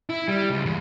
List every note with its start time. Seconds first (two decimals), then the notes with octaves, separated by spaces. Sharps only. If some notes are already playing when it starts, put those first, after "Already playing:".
0.09 E4
0.28 G3
0.50 C#2
0.66 E2